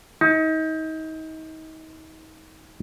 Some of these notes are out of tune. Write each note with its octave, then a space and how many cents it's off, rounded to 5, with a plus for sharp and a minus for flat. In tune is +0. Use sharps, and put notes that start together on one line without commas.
D#4 +35